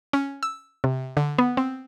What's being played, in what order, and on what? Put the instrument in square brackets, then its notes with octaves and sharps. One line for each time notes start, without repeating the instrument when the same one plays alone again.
[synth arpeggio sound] C#4
E6
C3
D3
B3
C4